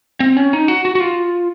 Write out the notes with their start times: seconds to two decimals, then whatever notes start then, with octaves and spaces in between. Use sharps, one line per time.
0.20 C4
0.37 C#4
0.53 D#4
0.68 F#4
0.85 F#4
0.95 F#4
1.00 F4